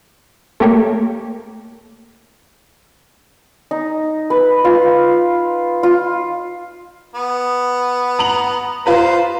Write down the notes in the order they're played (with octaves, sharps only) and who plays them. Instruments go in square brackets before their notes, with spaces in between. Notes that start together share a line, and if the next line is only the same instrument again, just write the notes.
[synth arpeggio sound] A3 A#3 G4 A#4 C#5
[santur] D#4
B4
F4
F4
[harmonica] B3
[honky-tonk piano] A#5 F7 F#7
[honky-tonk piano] F4 B4 A#5 [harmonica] C5